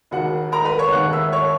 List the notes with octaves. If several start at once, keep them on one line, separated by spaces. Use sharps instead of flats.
E1 D#2 D#3 F#4 F#5
A#4 A#5
B4 B5
C#5 C#6
E1 D#2 D#3 F#5 F#6
E5 E6
C#5 C#6